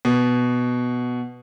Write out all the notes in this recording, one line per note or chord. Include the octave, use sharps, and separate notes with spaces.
B2